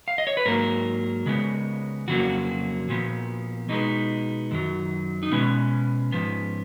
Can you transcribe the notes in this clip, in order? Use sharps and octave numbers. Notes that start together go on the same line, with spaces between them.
F5
D#5
C#5
B4
G#2 F#3 A#3 A#4
C#3 G#3 B3
F2 C#3 F#3 A#3 F#4
A#2 F3 B3
B2 G#3 B3 D#4
F#2 D#3 F#3
D#4
B2 G#3 B3 C#4
G#2 F3 B3